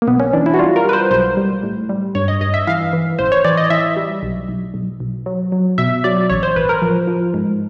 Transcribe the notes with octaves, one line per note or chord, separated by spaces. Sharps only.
A#3
B1 B3
C#4
E3 D4
E4
F#4
G3 F4
A#4
G3 B4
C5
B1 C5
G3
A2
G3
G2 C#5
D#5
G2 D#5
E5
E3 F5
E3
A1 C5
C#5
E3 D5
D#5
E3 E5
G3
B1
B1
B1
B1
F#3
F#3
B2 E5
F#3 D5
A1 C#5
C5
A1 B4
A#4
F3
F3
G#2